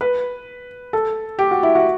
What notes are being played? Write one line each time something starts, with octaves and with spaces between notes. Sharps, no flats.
B4
A4
G4
F#4
E4
F#4